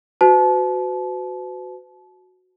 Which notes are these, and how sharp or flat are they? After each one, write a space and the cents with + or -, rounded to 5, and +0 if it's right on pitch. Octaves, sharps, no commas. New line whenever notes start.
F#4 -5 B4 +40 A5 -30